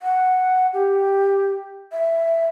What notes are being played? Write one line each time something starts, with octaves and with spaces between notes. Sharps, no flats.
F#5
G4
E5